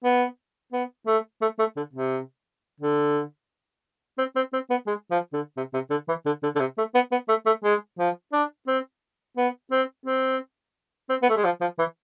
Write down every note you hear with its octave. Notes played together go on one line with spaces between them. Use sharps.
B3
B3
A3
A3
A3
D3
C3
D3
C4
C4
C4
B3
G#3
F3
D3
C3
C3
D3
E3
D3
D3
D3
C3
A3
B3
B3
A3
A3
G#3
F3
D4
C4
B3
C4
C4
C4
B3
A3
G#3
F3
F3
E3